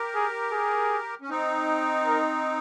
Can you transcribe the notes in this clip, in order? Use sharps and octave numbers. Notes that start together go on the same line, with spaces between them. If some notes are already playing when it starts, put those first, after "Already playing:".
Already playing: G4 A#4
G#4
G#4
C#4
C4 D#4
A#4